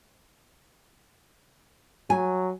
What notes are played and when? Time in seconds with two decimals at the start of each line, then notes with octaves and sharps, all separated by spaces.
2.10 F#3 G#5